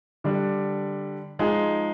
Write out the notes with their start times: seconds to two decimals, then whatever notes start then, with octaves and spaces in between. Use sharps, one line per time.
0.24 D3 G3 D4
1.39 F3 G#3 D#4 G#4